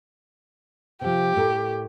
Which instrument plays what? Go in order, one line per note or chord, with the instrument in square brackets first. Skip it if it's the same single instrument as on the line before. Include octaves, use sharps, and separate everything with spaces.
[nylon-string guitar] C3 F3 [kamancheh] G4
[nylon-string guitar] A2 A4 A#4